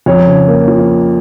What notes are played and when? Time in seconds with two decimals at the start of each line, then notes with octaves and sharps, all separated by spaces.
0.06 F2 C#5
0.26 C#3
0.48 A#3
0.68 F3